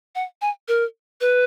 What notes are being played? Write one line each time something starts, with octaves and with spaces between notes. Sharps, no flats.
F#5
G#5
A#4
B4